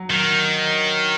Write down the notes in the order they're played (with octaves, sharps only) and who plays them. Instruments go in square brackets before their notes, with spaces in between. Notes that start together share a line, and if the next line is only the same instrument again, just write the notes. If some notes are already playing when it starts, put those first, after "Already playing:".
Already playing: [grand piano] F#3
[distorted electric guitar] D#3